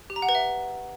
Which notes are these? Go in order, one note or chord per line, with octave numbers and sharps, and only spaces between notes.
G4
A#5
F#5
B4
E5